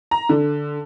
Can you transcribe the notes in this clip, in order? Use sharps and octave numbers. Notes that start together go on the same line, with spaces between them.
A#5
D3